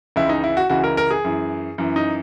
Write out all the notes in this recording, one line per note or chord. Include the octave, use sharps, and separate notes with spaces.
C#2 C#3 E3 E4
D#4
E4
F#4
C#2 C#3 E3 F#4
A#4
A#4
G#4
F#2 E3
F#2 E3
D#4